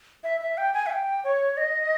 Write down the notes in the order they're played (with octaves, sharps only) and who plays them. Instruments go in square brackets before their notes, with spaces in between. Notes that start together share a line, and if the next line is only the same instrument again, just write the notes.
[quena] E5
E5
G5
G#5
E5
G5
C#5
D#5